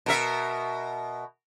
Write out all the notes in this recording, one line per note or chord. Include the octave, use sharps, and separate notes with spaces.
B2 A#4 E5